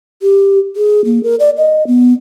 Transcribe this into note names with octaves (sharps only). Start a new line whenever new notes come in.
G4
G#4
A#3
A#4
D5
D#5
B3